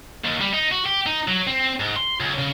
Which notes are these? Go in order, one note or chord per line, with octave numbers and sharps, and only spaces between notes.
D#2
G3
D#4
F#4
G4
D#4
F#3
C4
G#2
C6
C#2
C#3